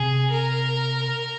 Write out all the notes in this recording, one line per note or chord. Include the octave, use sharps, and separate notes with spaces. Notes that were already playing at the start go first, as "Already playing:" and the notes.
Already playing: C3 G#4
A#4